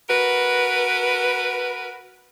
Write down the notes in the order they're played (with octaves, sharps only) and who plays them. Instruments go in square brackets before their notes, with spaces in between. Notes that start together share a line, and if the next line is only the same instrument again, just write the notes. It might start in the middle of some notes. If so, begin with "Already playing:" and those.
[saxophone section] F#4 A#4 B4